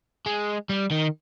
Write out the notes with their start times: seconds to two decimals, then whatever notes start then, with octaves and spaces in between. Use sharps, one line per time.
0.26 G#3
0.69 G3
0.91 D#3